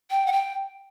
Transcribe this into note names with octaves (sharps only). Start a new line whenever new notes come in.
G5
F#5
G5